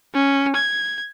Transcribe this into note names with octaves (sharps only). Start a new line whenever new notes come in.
C#4
G#6